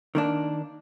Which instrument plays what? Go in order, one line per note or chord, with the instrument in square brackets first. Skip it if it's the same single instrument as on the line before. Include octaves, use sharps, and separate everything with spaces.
[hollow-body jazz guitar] D#3 A#3 D4